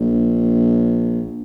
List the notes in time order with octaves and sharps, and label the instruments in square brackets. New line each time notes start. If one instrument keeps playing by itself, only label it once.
[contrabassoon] A#1